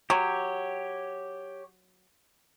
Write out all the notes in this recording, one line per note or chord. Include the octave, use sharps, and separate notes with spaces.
F#3 G4 C#5